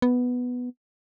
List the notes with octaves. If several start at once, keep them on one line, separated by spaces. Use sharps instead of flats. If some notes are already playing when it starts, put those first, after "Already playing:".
B3